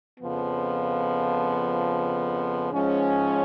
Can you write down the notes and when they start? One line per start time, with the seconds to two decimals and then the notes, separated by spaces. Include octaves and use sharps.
0.20 F2 C#3 F3 B3
2.72 G#2 F3 G#3 C#4